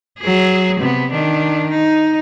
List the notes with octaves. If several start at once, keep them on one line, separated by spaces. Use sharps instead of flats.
F#3 G#4
C3 B3
D#3 D4
D#4